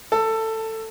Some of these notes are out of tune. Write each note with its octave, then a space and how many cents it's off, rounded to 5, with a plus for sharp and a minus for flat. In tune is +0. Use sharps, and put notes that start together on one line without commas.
A4 +15